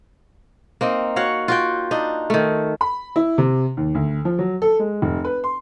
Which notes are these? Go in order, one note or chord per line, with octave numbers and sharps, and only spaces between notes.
A#3 C4 D#4
F#4 C#5 F5 F#5
F4 F#4 G5
D4 D#4
D#3 A3
B5
E4
C3
D#2
D2
F3
F#3
A4
G#3
F1
B4
C6